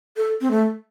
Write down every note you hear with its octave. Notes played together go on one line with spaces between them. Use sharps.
A4
C4
A3